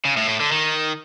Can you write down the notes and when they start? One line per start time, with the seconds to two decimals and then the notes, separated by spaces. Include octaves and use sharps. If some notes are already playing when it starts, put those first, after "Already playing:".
0.05 C#3
0.17 A2
0.28 A2
0.40 D3
0.52 D#3